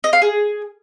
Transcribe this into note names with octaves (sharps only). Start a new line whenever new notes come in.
D#5
F5
G#4